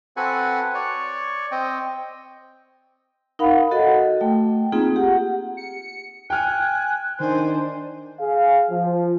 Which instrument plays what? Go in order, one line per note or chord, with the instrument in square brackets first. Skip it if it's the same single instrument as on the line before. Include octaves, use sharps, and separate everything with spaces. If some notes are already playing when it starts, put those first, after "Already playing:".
[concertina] C4 F#4 A4 B4 F#5 G#5
C#5 D5 C#6
C4 D#5 G5
[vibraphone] D#4 A#4 F5 F#5 B5
F#4 A4 D#5 F#5
A3 G5
A#3 C4 D#4 F4 G#4
G4 F#5
[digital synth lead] C#7
[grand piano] G5 F6 [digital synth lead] G#5 [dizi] F#6
[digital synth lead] D#3 [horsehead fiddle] D4 C5 [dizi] G#5
[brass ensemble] G#4 F5
F3